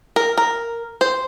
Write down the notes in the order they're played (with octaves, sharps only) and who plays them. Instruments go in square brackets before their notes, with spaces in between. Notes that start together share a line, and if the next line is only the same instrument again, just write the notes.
[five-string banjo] A#4
A#4
C5